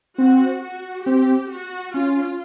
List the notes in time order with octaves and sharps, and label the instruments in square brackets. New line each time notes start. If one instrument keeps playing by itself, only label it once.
[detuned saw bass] C4 [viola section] F#4
[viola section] F#4
[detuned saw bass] C4 [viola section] G4
[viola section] F#4
[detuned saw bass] C#4 [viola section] F4